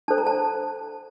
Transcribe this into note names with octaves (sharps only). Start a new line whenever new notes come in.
D4 A4 C5 A5
A#5
A5